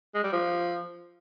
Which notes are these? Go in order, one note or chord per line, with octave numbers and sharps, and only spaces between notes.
G#3
G3
F3